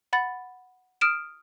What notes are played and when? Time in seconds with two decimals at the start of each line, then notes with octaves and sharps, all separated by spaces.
0.13 F#5 B5 A6
1.01 D#6 F6 D7 E7